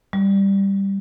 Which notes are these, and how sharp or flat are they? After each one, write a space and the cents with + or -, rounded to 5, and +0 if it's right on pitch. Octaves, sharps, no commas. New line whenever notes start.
G3 +5